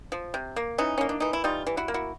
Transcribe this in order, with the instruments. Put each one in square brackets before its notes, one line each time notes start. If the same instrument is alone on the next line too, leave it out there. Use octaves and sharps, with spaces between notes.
[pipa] F3
C3
A#3
E3 C#4 D#4
A#3 C#4
D4
E3 D#4
E4
G3 D#4 F4
E3
E4 F#4
A#3
E4 F#4